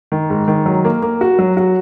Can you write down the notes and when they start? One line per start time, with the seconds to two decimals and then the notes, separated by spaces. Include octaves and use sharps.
0.12 D#3
0.30 G#2
0.48 D#3
0.66 F#3
0.85 A#3
1.02 A#3
1.21 F#4
1.39 F#3
1.57 F#4